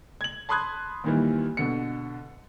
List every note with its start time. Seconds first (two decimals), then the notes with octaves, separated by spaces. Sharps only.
0.21 G#6 F#7
0.49 A5 B5 C6 D#6 F#6 G#6
1.04 D#2 A#2 D#3 E3 G3
1.57 B2 D3 C#7